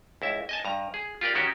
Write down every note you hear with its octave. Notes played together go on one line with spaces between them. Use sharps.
C#2 E4 E5
D#5 G#5 A5
G2 A#5
G#4
F4 G4 A#4 D5
D#3 C#4 F#4 G4